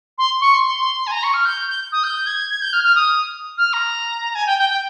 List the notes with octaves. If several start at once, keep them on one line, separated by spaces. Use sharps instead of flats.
C6
C#6
C6
G#5
A#5
C#6
F6
G6
G6
D#6
G6
G#6
G#6
G6
F6
F6
D#6
F6
A#5
G#5
G5
G5
G5